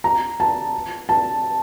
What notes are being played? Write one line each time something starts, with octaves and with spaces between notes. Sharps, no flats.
A#5
A5
A5